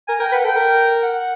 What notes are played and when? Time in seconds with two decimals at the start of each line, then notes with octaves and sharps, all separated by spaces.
0.08 A#4 G#5
0.20 A#4 G5
0.32 B4 F#5
0.44 A4 G5
0.56 A#4
1.03 F#5